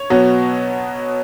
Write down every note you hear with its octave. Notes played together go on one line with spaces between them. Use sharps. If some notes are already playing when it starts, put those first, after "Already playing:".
Already playing: C#5
B2 F#3 B3